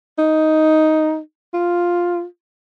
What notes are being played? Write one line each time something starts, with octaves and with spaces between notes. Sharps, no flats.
D#4
F4